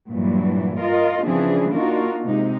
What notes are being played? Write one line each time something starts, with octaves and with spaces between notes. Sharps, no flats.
G2 A#2 E3 F#3
F4 A#4 D#5
C#3 E3 F3 C4 D4 G#4
A#3 D4 D#4 F4 F#4 A#4
C3 G#3 D#4